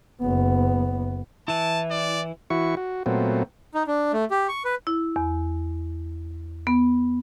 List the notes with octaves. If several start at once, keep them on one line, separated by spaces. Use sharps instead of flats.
F#1 B3
E3 E4 A5
D5
E3 E4 F#4 C#6
F#4
A#2 F#3 A3 B3 C4
D#4
D4
A3
G4
C#6
B4
E4
E2
B3